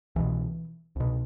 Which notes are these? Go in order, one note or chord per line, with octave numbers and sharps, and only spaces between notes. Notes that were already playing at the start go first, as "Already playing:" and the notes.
C2 B2 E3
C2 B2